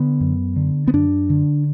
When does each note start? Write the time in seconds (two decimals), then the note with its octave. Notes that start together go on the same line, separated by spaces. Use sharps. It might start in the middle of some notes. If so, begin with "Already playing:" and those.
Already playing: D3 B3
0.20 F#2
0.56 D3
0.88 B3
0.93 F#2 D4
1.30 D3